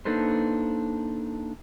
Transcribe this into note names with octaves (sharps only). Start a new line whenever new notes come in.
A#3 D4 D#4 A4 B4 C5